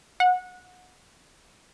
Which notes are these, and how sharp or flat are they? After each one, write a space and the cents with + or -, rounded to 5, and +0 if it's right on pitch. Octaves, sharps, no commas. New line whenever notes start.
F#5 -20